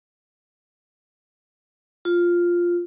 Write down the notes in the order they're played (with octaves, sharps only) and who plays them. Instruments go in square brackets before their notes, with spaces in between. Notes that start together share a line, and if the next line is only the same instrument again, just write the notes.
[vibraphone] F4